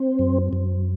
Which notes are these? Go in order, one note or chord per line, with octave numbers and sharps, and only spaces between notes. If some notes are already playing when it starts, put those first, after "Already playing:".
Already playing: C4
F#2
F#2